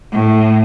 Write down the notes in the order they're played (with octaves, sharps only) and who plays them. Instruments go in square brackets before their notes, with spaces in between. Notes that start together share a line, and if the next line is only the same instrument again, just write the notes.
[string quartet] A2